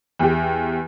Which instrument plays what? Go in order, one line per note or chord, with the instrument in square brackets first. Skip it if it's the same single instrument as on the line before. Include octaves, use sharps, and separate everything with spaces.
[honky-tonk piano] E2 G4